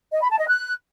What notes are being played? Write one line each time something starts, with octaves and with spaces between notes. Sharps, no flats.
D#5
B5
A5
D#5
F#6